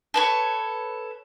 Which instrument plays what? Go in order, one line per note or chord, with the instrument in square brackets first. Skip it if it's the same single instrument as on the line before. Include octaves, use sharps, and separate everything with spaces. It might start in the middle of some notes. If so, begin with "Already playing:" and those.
[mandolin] A4 B4 C#5